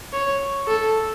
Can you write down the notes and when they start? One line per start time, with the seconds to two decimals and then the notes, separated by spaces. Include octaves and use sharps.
0.13 C#5
0.68 A4